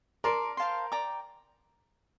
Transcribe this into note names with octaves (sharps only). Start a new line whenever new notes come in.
A#4 D5 A5 C6
C5 F5 A5 C6
D5 G5 A#5 D6